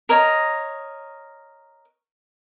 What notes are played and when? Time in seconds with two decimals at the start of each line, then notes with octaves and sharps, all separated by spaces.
0.09 A#4 C#5 D#5